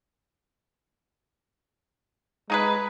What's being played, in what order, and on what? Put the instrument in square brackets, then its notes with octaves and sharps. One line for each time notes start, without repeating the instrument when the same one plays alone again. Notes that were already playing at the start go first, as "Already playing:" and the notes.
[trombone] G#3 [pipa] D#4 G#4 B4